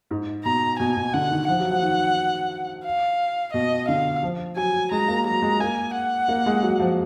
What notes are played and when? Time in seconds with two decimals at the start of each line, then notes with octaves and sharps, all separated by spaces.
0.11 G#2
0.44 B2 A#5
0.79 B2 G#5
0.97 B2
1.13 D3 F#5
1.31 D#3
1.48 F3 F#5
1.60 F#3
1.71 F3
1.83 D#3
2.85 F5
3.53 B2 D#5
3.88 D3 F5
4.23 F3
4.56 F#3 G#5
4.91 G#3 A#5
5.08 A#3
5.25 F#3 A#5
5.42 G#3
5.60 A#3 G#5
5.94 F#5
6.28 A#3
6.46 G#3
6.63 F#3
6.80 F3